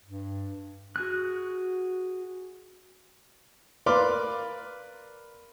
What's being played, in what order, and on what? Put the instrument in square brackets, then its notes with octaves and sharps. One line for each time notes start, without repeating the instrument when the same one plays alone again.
[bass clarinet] G2
[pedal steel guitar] F#4 G#4 F#6
[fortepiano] A#4 B4 D5 F5 C6 D6